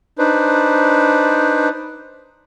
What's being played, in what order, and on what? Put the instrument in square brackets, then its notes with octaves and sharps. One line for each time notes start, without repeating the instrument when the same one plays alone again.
[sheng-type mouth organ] D4 D#4 B4 C5